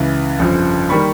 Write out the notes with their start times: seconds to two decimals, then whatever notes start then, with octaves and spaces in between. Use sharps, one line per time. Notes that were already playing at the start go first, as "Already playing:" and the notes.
Already playing: C#2 C#3 E3
0.39 G1 F2 C#3 F3
0.89 D#3 G3 A#3 B5 C#6